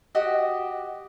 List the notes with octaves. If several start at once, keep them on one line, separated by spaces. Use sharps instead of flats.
F#4 G4 D#5 D#6